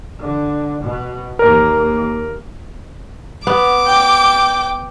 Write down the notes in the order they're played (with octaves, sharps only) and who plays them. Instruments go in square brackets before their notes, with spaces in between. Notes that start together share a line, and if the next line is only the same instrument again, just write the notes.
[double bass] D3
B2
[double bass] D#2 A#3 [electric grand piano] A#4
[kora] B3 [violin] D6
[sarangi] G5